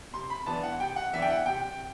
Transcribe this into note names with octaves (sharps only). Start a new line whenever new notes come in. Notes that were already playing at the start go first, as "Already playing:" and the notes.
C3 C6
B5
E3 B3 D4 A5
F#5
C3 G5
F#5
E3 B3 D4 E5
G5
F#5
C3 G5